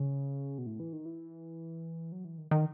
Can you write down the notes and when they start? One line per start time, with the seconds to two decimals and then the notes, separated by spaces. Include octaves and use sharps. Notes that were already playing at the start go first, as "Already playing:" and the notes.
Already playing: C#3
0.58 B2
0.66 A2
0.80 E3
0.93 D#3
1.06 E3
2.12 F#3
2.25 E3
2.38 D#3
2.51 D#3